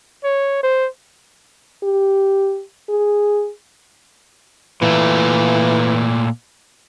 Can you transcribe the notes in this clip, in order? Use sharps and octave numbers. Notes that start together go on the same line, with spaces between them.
C#5
C5
G4
G#4
A#2 E3 A3